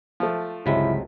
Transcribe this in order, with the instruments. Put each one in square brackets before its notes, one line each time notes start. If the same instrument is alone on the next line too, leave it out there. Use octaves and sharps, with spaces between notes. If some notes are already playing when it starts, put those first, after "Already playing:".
[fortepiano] F3 A3
[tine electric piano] G1 C#2 B6 [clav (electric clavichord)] C3 F#3 G#3 [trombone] E4